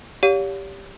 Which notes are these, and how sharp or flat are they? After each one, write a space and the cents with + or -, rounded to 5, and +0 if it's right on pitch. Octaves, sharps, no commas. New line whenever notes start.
G4 +5 C#5 +35 F5 +40